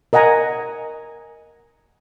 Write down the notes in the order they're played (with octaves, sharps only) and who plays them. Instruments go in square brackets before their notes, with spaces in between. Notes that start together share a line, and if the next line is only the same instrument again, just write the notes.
[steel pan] A#4 D#5 F#5 G#5 A#5